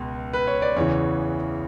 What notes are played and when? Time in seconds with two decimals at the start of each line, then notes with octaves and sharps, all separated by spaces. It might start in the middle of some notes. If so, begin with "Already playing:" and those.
Already playing: C#2 B2
0.33 B4
0.47 C#5
0.62 D5
0.76 E2 C#3 E3 C#5